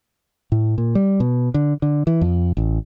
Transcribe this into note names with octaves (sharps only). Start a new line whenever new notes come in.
A2
A#2
G3
B2
D3
D3
E3
F2
A1